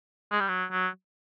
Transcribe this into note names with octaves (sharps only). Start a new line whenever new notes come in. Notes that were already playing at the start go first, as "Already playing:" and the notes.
G#3
G3
F#3
F#3